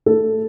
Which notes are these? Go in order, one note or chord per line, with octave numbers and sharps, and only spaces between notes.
A3 A4